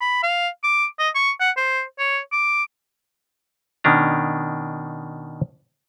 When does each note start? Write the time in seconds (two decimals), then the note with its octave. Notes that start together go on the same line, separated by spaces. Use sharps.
0.01 B5
0.23 F5
0.63 D6
0.99 D#5
1.15 C#6
1.40 F#5
1.57 C5
1.99 C#5
2.32 D6
3.84 B2 D#3 C#4 D4 A#5